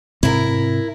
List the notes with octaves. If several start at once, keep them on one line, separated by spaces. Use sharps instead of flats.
G#2 C3 C4 E4 A#4